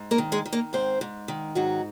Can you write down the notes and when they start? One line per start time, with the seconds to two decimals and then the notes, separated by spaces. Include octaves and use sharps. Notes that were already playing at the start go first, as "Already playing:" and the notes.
Already playing: G#2
0.11 A#3 A#4
0.18 D#3
0.32 G#3 G#4
0.46 D#3
0.52 A#3 A#4
0.73 G#2 C4 C5
1.01 G#2
1.28 D#3
1.55 G#2 F#3 F#4